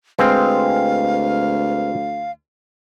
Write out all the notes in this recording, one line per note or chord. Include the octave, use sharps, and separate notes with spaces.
D2 G#3 C4 B4 F5 F6